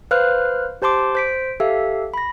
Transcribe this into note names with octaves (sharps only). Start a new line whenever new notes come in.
B4 C5 F5 F6 F#6
G4 C5 A5 C6 D6
C5 B6 D7
G4 A4 E5 F5
B5 A#6